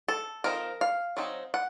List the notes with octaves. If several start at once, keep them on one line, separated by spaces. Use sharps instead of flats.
A4
F3 C4 D#4 A#4
F5
F#3 C4 D#4
F#5